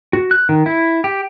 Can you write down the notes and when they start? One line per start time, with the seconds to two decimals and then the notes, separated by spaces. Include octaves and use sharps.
0.13 F#4
0.31 F#6
0.49 D#3
0.66 E4
1.04 G4